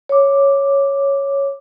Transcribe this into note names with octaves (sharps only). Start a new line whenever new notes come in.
C#5 D6